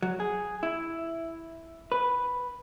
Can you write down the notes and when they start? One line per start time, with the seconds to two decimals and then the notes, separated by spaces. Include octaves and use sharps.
0.02 F#3
0.20 G#4
0.63 E4
1.92 B4